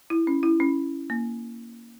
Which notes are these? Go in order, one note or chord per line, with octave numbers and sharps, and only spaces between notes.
E4
C#4
E4
C#4
A#3